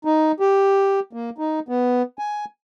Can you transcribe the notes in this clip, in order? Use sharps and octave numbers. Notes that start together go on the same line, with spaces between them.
D#4
G4
A#3
D#4
B3
G#5